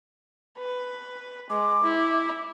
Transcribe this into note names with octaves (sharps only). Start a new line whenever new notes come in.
B4
G#3 D6
E4